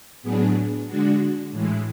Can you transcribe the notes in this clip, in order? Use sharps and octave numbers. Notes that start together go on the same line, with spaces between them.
A2 F#3 B3 D4 G#4
D3 G#3 D4 F#4
A2 E3 G#3